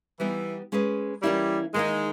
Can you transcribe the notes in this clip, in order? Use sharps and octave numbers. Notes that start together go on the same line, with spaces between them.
E3 G3 B3 D#4
G#3 C#4 G#4 B4
E3 G3 A#3 C#4 E4
D#3 G#3 A#3 D#4